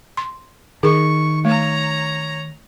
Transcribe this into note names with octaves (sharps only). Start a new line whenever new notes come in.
C6
D#3 G#4 A#4 C#6
A3 C#5 A#5